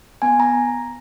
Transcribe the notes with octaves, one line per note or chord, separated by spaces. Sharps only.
B3 G#5
A#5